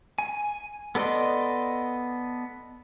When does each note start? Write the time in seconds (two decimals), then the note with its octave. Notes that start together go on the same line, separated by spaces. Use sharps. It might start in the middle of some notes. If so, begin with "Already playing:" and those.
0.19 G#5
0.95 B3 A4 D5 D#5 C6